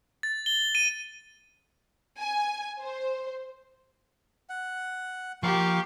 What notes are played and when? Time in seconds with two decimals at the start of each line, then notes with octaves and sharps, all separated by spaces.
0.23 A6
0.46 G7
0.75 D#7
2.20 G#5
2.83 C5
4.49 F#5
5.43 F3 A#3 G4 F5 C#6